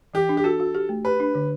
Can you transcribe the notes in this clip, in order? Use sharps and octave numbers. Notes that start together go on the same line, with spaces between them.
E3 G4
D4
G4
F#4 A4
F#4
G4
A3
G4 B4
D4
D3